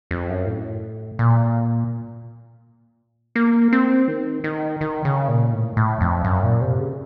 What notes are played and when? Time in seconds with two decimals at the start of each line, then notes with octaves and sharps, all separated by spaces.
0.11 F2
0.29 F#2
0.47 A2
1.19 A#2
3.36 A#3
3.73 C4
4.08 D#3
4.44 D#3
4.81 D#3
5.05 C#3
5.28 A#2
5.52 A2
5.77 A2
6.01 F2
6.25 F#2
6.43 A#2
6.61 C3
6.79 C#3